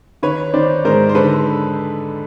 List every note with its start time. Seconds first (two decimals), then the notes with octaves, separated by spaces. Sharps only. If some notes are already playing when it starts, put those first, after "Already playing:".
0.23 D#3 B4 C#5
0.53 D#3 C5 D5
0.85 G#2 A#4 C5
1.09 C5
1.15 D3 A4 B4